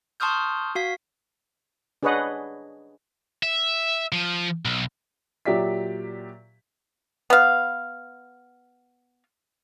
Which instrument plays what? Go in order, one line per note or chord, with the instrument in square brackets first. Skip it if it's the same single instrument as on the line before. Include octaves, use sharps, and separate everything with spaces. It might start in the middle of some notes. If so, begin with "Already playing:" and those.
[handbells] A5 C6 C#6 D#6 F6 G6
F#4 F5 B6
[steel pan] D4 G#4 B4 C#5 D#5 F#5
[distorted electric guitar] E5
F3
B1
[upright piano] A#2 F#3 G4 D5 E5 B6
[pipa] B3 F5